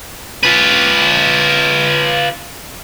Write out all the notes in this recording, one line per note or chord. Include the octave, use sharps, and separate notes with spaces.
F4 B4